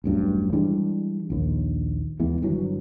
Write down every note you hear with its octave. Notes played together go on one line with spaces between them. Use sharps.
E1 A1 G2 F#3
E3 G3 G#3 D4
A#1 D#2
D#2 E3 G#3 B3
G1 E3 F#3